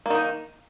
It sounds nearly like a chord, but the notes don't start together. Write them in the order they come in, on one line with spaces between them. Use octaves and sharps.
A#3 D#3 D#4